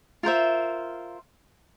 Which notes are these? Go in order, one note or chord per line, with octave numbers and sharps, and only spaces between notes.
F4 A#4 C5 E5